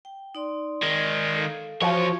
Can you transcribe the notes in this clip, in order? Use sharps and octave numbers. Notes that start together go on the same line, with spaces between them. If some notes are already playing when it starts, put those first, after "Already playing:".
G5
D#4 D5 C6
D#3 G#3
A4 F5
E2 F3 F#4 C#5